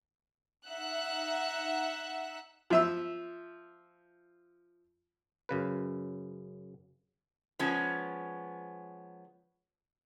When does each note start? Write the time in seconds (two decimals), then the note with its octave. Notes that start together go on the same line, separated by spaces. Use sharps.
0.67 D#4 E5 F#5 F#6
2.70 F3 E5 E6
5.49 F#2 C#3 B4
7.59 F3 G#3 B3 C#4